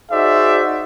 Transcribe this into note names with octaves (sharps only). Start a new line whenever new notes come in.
D#4 F#4 G#4 C5 D5 E5